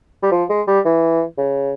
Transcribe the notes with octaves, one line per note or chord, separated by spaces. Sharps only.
G3
F3
G#3
G3
E3
C#3